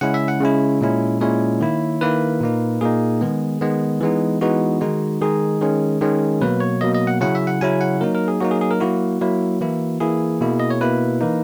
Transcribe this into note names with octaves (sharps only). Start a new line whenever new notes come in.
C#3 G#3 C#4 E4 F#5
E5
F#5
C#3 G#3 C#4 E4
A#2 G#3 C#4 E4
A#2 G#3 C#4 E4 C#5
D#3 A#3 E4
D#3 A#3 E4 B4
A#2 A#3 D#4
A#2 A#3 D#4 G#4
D#3 G#3 B3
D#3 G#3 B3
E3 G#3 B3 D#4
E3 G#3 B3 D#4 F#4
D#3 G#3 D#4
D#3 G#3 D#4 G#4
D#3 G#3 C#4
D#3 G#3 C#4
B2 F#3 A#3 B4
C#5
B2 F#3 A#3 D#5
D#5
F#5
C#3 F#3 C#4 E4 F#5
E5
F#5
C#3 F#3 C#4 E4 G#5
F#5
F#3 A#3 D#4 A#4
A#4
G#4
F#3 A#3 D#4 F#4
G#4
G#4
A#4
F#3 A#3 E4 F#4
F#3 A#3 E4
E3 A#3 E4
E3 A#3 E4 G#4
B2 A#3 E4
D#5
C#5
B2 A#3 E4 B4
E3 A#3 D#4